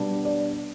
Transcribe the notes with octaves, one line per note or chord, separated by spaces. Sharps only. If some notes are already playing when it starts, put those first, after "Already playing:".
Already playing: B2 G3 B3 D4
D5